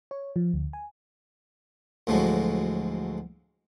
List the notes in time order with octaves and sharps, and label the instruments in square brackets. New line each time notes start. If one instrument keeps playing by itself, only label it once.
[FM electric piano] C#5
F3
D2
G#5
[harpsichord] D2 A2 F3 F#3 G#3